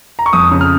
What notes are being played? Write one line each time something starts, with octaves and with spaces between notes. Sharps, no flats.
A#5
C#6
F2 D#6
C#3
F6